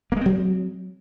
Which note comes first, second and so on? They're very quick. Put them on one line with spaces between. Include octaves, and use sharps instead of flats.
A#3 G#3 C4 F#3